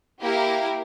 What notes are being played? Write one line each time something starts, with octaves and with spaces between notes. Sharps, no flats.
A#3 E4 G4 A#4 F5